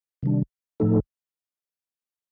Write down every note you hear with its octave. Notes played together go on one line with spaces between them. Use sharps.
C3 D#3 G3 D4
A2 F3 A3 D#4 A4